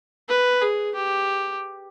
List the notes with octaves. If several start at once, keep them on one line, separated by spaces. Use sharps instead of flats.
B4
G#4
G4